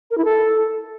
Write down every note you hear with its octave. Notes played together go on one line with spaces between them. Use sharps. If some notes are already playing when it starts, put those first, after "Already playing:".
A#4
E4
A4